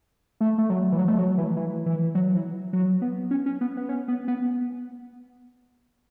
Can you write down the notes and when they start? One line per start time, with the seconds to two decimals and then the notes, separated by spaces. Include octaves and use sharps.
0.40 A3
0.58 A3
0.70 F#3
0.92 E3
0.98 F#3
1.08 A3
1.19 F#3
1.38 E3
1.56 E3
1.86 E3
2.15 F#3
2.35 E3
2.73 F#3
3.02 B3
3.31 C#4
3.46 C#4
3.61 B3
3.77 B3
3.89 C#4
4.08 B3
4.28 B3